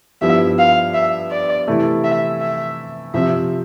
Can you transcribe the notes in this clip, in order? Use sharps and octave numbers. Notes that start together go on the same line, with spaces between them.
G2 F3 B3 E4 G4 E5
F5
E5
D5
C3 E3 A3 E4
E5
E5
C3 F3 C4 E5